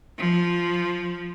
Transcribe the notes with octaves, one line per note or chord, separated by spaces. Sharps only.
F3